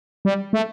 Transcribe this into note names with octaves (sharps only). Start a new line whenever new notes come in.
G3
A3